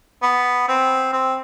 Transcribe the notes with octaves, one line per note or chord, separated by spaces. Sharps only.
B3
C4
C4